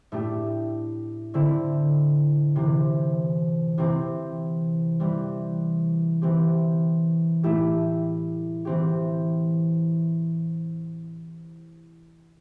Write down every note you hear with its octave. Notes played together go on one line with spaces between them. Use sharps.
A2 A3 D4 G4
D3 C4 E4
C3 E3 C4
C3 E3 C4
E3 G3 C4
E3 C4 G4
A2 A3 E4 G4
E3 C4 G4